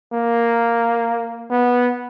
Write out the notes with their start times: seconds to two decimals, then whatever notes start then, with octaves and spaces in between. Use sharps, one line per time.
0.13 A#3
1.50 B3